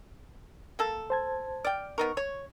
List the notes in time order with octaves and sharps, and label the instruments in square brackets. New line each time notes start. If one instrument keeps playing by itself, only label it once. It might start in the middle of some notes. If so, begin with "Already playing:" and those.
[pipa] A#3 A4
[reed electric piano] C5 A5 G#6
[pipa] D5 G5 [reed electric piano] F6
[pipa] B3 D#4 A#4 [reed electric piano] C#6
[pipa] C#5